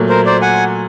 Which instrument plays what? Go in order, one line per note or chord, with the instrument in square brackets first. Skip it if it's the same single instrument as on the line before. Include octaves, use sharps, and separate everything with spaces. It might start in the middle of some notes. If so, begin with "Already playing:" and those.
Already playing: [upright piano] A#2 F#3 A3
[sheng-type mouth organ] A#4 C5
C5 D5
F#5 G#5